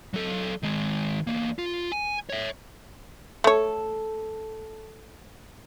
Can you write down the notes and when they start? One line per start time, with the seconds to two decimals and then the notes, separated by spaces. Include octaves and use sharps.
0.14 F#3 A4
0.63 D#3 G#3
1.27 E2 A#3
1.59 F4
1.92 G#5
2.29 C#5 E5
3.44 A3 A4 C#5